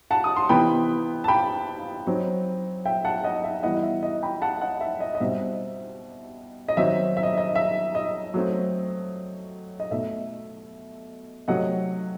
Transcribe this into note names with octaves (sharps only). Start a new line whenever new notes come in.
F#5 A5
D#6
C6
C3 E3 B3 D#4 G5 B5
A5
G5 B5
F#3 C4 D#4
E5 G5
F#5 A5
D#5 F#5
E5
E3 G3 B3 E4 D#5 F#5
E5
D#5
G5 B5
F#5 A5
D#5 F#5
E5
D#5
D#5
B2 G3 C4 D#4 E5
D#5
D#3 F#3 C4 D#4 E5
E5
D#5
D#5
E5
D#5
F#3 A3 C4
D#5
B2 A3 D#4 E5
C3 F#3 A3 D#5 F#5